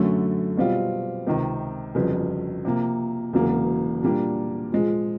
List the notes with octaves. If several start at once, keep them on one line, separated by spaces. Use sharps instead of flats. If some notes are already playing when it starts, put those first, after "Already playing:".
Already playing: F#2 D3 F#3 A3 C#4
B2 G3 C4 F4
C#2 C3 D#3
G1 F2 C#3 F#3
C3 F3 A#3
E1 E2 C#3 F#3 A#3
A#2 G3 A#3 D4
A#2 F3 G#3